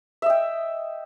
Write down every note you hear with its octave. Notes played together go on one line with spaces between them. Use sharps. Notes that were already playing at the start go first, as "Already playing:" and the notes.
D#5 E5 G5